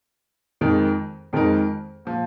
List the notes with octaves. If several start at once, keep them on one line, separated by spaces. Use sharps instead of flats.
F2 D#3 G#3 D#4 A#4
F2 D#3 G#3 D#4 A#4
A#2 F3